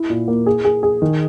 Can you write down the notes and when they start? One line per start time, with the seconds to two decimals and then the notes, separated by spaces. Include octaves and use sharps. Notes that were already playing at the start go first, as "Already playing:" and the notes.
Already playing: E4
0.10 A#2
0.28 A#3
0.46 G#4
0.65 G#4
0.83 G#4
1.02 D#3